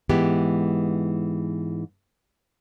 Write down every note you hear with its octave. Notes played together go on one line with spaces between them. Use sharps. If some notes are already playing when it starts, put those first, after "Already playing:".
G#2 E3 G#3 B3 G4